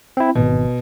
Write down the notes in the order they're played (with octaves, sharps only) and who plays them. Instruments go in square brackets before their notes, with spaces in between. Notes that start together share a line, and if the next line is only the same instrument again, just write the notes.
[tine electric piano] C4 E4
[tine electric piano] G#1 [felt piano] B2